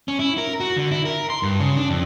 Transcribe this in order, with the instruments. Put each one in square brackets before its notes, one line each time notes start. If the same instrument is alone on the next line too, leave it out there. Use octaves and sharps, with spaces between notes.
[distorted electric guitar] C#4
E4
A#4
F#4
D3
E4
A#4
C6
G2
C#3
D4
F2